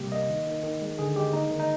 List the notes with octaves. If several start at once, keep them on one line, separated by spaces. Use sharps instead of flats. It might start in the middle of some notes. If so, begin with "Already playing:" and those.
Already playing: C3 G3 A#3 G4
A#3 D#5
D#3
D#3
D#3
G#3
D3 G#4
G#3 G4
A#3 D#4
D#3
D#4